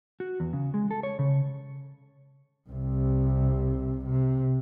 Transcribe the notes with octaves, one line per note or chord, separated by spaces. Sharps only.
F#4
E2
C#3
G#3
A4
C#5
C#3
C2 C3
C3